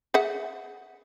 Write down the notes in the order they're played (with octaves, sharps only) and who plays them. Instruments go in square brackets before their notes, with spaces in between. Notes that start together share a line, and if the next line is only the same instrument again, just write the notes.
[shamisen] G#4 E5 F#5